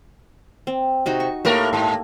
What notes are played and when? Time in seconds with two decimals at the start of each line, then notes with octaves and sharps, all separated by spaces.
0.67 C4
1.06 C3 D#4 F#4
1.20 C#6
1.45 A2 A3 A#3 G4 A#4
1.73 G#2